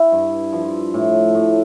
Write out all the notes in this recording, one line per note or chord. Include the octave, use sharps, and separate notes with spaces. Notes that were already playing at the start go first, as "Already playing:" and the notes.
Already playing: E4
G2
F3
A2
A2